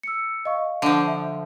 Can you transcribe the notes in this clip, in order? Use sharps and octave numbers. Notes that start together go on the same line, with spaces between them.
E6 C#7
D#5 F5 C#6
D3 F3
E5